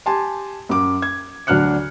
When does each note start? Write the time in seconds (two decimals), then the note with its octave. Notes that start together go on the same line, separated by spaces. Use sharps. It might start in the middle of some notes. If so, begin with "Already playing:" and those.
0.06 G4 G#5 A5 C6
0.69 F#2 D6
1.02 G#6
1.47 D2 F#3 D4 F6 F#6 C#7